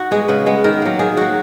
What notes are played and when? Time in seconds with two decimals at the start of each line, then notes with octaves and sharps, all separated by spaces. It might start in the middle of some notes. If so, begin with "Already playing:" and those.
Already playing: D#4 F#4
0.11 G#3 B3 G#4
0.28 C#3 B4
0.46 G#3 B3
0.64 D#3 A#4
0.82 F#3 A#3
0.99 D#3 G#4
1.17 F#3 A#3 F#4